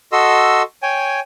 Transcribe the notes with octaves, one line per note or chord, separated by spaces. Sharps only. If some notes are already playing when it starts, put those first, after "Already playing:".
F#4 A4 D#5 C6 E6
C#5 G5 G#5